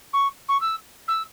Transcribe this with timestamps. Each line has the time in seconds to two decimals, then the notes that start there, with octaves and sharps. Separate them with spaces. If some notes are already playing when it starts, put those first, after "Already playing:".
0.13 C#6
0.48 C#6
0.60 E6
1.08 E6